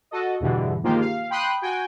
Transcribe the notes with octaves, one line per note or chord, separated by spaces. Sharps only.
F#4 A4 D#5
E2 G2 B2 D3 E3
D#3 F3 G#3 A#3 F4 G4
F5
G5 B5 C6 D#6 F#6
F#4 G5 G#5